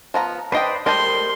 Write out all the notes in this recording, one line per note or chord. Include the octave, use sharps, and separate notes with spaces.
F3 B3 A#5
D4 B4 C5 D5 D#5 G5
G3 A#4 C5 D#5 A5 C6 G6